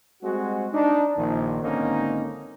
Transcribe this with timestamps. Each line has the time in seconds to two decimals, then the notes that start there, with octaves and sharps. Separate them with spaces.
0.22 G3 G#3 C4 F#4
0.73 D4 D#4
1.16 A#1 D#3
1.62 G#1 D3 A#3 C4 C#4 D#4